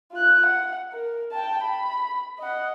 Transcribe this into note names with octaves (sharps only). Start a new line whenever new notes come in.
F4 F#6
F#5
A#4
G5 A5
B5
D#5 F#5